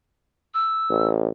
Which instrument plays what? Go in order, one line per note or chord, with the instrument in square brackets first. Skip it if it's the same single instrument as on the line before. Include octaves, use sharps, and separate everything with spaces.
[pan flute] E6
[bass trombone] A1